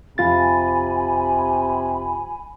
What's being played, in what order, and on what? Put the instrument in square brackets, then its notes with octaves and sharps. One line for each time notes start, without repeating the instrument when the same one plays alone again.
[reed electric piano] F2 F4 A6 [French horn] C3 [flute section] G#5 B5